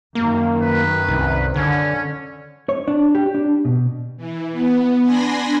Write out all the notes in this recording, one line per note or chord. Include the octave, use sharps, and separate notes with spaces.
F#2 D#3 A#3
B4
C2
D3 C#4
C#5
D4
G4
D4
B2
E3
B3
D4 G#5 B5 C6 A#6